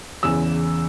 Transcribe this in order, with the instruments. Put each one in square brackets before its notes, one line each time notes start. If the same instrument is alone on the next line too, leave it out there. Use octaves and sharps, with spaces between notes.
[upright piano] E2 C#3 E3 E6